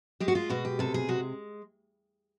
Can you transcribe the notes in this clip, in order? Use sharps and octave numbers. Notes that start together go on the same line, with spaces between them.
G#3 G4
F#4
F4
B2 F#4
G4
C3 A4
G#4
G#3 F#4